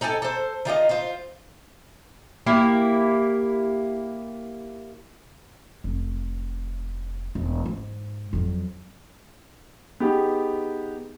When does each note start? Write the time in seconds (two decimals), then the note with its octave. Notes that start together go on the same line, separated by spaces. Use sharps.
0.01 D#4 A4 G5 G#5
0.22 A4 C5
0.65 D#3 F4 G4 D#5
0.89 F4 C5
2.46 A#3 E4 G4
5.84 F1
7.35 E1
7.66 G#2
8.33 F2 F#3
10.00 B3 D#4 G4 G#4